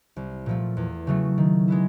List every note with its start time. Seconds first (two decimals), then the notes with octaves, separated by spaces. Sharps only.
0.16 C2
0.46 A#2 F3 A3
0.77 E2
1.07 C#3 F#3 A3
1.38 D#3
1.68 G#3 B3 E4